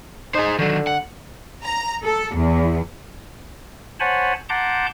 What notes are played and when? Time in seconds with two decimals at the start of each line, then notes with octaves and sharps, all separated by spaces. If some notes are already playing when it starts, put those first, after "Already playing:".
0.35 D#4 G#4 C5
0.59 D3 D#3 F#3
0.87 F#5
1.64 A#5
2.03 A4
2.35 E2
4.00 C5 C#5 F#5 G#5 A5 B5
4.49 F#5 A5 A#5 C6 D6 G6